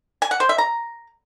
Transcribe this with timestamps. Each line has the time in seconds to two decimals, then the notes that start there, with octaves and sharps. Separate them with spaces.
0.22 G#5
0.31 F#5
0.40 C5
0.49 E5
0.58 A#5